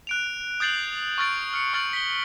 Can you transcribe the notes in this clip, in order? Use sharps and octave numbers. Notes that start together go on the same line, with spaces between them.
F#6 D7 F7
D#6 G6 A6 C7 F#7
C#6 F6 A6 D7
F6 C#7
C#6 F6 A6 D7 F#7
B6 G7